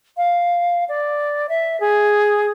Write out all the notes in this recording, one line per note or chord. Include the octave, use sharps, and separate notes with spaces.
F5
D5
E5
G#4